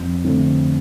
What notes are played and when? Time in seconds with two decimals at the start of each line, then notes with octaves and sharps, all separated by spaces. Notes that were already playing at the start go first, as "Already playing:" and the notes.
Already playing: F2
0.24 D3 A3 C4